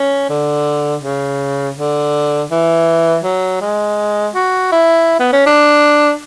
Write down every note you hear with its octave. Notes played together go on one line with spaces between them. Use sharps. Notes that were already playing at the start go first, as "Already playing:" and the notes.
Already playing: C#4
D3
C#3
D3
E3
F#3
G#3
F#4
E4
B3
C#4
D4